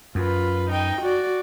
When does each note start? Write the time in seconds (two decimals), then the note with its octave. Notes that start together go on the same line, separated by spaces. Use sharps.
0.15 F#2 F4 B4
0.70 D#4 G5
1.01 F#4 D5